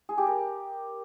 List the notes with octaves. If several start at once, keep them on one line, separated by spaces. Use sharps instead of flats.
G#4
G4
A#4